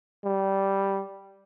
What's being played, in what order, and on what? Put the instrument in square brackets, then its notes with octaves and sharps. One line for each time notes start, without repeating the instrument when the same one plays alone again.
[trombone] G3